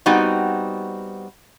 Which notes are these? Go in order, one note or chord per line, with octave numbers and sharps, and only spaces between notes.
G3 B3 C4 D#4 F#4